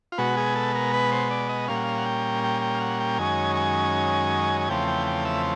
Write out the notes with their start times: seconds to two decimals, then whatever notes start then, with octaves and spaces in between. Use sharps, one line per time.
0.12 F4
0.18 B2 G#3 B3 F#4
0.37 G#4
0.56 A4
0.75 A#4
0.93 B4
1.12 C5
1.31 D5
1.49 D#5
1.68 A#2 G3 A#3 C#4 F5
1.76 F#5
1.84 F5
1.98 F#5
2.06 G5
2.44 G5
2.62 G5
2.75 F5
2.81 F#5
3.00 G5
3.18 F#2 D#3 G#3 C#4 G#5
3.57 G#5
4.61 G#5
4.68 E2 C#3 F3 A3 C4 G5
4.88 G5
5.07 G5
5.25 E5